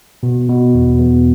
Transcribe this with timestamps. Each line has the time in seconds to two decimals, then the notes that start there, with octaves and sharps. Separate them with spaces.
0.23 B2
0.49 B2
0.75 E2
0.99 E2